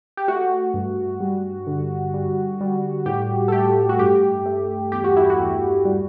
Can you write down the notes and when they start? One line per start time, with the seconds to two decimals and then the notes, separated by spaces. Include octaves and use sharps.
0.17 G4
0.28 A3 F#4
0.74 G2
1.20 G3
1.67 D3
2.14 G3
2.61 G3
3.06 A2 G4
3.48 A4
3.52 A3 G4
3.89 F#4
3.99 G2 G4
4.46 A3
4.92 E2 G4
5.04 F#4
5.17 E4
5.30 F#4
5.38 E2
5.85 G3